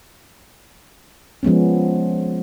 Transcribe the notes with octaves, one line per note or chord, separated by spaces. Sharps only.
F3 G#3 B3 C#4